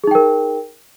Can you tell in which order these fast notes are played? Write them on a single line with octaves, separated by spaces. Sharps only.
G#4 D#4 G5 A#4